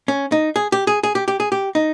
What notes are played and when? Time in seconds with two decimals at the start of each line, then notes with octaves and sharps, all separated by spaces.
0.08 C#4
0.32 D#4
0.56 G#4
0.72 G4
0.87 G#4
1.03 G#4
1.15 G4
1.28 G4
1.40 G#4
1.52 G4
1.75 D#4